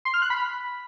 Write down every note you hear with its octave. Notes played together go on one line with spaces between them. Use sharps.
C6
F6
F#6
B5